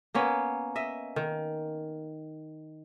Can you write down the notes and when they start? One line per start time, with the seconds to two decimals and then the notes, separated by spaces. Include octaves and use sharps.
0.14 A#3 B3 C#4
0.76 D#5 E5
1.16 D#3